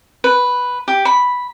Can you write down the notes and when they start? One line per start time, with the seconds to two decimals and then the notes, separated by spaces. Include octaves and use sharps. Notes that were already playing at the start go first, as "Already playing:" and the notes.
0.24 B4
0.88 G4
1.05 B5